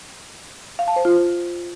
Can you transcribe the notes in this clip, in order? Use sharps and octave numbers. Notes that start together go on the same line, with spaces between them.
F5
A5
C5
F4